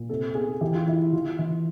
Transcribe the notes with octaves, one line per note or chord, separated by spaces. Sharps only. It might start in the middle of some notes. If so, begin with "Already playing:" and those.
Already playing: A#2
C3 A4
B3 G#4
E3 G4
F4
E3 E4
E3 F4
E3